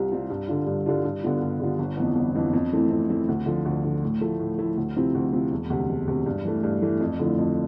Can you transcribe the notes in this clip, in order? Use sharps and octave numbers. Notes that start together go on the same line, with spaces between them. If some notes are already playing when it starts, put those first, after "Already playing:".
Already playing: C2 C3 G3 C4 F4
C3 G3 C4 F4
G2
D3 G3 D4 F4
G2
D3 G3 D4 F4
G2
D3 G3 B3 F4
G2
D3 G3 B3 F4
G1
F2 E3 B3
G1
F2 E3 B3
F2
E3 A3 C4 E4
F2
E3 A3 C4 E4
D2
D3 F3
D2
D3 F3
A2
F3 A3 E4
A2
F3 A3 E4
D2
C3 F3 C4 E4
D2
C3 F3 C4 E4
E1
D2 C3
E1
D2 C3
G2
E3 A3
G2
E3 A3
F2
D3 F3 A3 E4
F2